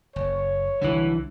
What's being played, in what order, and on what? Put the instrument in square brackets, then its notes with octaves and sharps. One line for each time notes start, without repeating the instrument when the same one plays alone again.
[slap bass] F#1 [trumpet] C#5
[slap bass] C2 F#3 G3 [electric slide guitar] D3 E3